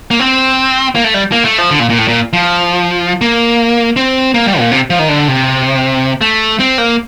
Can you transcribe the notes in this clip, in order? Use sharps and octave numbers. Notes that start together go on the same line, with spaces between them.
A#3
C4
A#3
A3
G3
A#3
A3
F3
D3
A#2
A#2
A2
A#2
F3
A#3
C4
A#3
G3
A#2
C3
F3
D#3
D3
C3
A3
C4
A#3